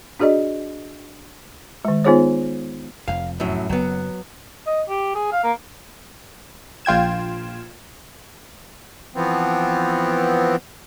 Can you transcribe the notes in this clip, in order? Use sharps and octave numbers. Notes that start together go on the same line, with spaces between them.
D4 F#4 G#4 D5 D#5
D#3 G#3
B3 D#4 F4 G#4 C5 C#5
F1 F2 F5
F#2 A2 F#3
F#1 F#2 F#3 B3
D#5
G4
G#4
F5
A#3
A#1 F4 G5 G#6 E7
E3 F3 B3 C4